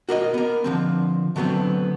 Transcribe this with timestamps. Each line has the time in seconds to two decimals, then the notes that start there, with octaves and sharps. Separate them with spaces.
0.09 F#4 A#4 B4 D#5
0.34 B3 A#4
0.64 D3 F3 C4
1.36 D3 F#3 A3 B3 C4